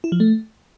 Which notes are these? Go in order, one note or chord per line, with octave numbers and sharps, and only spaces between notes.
E4
F3
A3